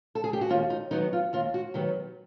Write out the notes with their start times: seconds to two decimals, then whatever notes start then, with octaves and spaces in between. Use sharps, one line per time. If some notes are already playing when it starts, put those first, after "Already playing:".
0.15 A4
0.24 G#4
0.33 G4
0.41 F#4
0.49 D#2 F4
0.70 D#4
0.91 D#3 F#3 B3 D#4
1.13 F4
1.33 D#2 F4
1.54 F#4
1.74 D#3 F#3 B3 G4